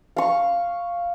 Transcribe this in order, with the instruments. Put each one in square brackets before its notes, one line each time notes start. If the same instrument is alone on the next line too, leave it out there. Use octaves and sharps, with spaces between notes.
[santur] F5 C#6